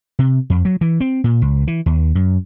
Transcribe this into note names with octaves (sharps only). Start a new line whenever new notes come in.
C3
F2
F#3
E3
C4
A#2
C#2
E3
D#2
F#2